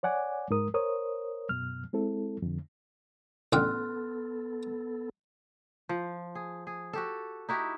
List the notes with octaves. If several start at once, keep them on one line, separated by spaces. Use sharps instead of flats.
C#5 D5 F#5 G#5 D6
G#2 G#3 A#4 D#6
A#4 C5 C#5 D#6
F#2 B2 F6
G#3 C4 E4 A4
F2 D3
A1 D3 B3 A4 G5 C6 F6 F#6
F3
G#4
G#4
F#4 G4 A4
D#4 E4 F#4 G4